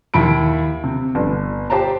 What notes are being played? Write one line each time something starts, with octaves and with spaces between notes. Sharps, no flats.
D#2 E4 B5 D7
C3
G1
G4 C5 A5 A#5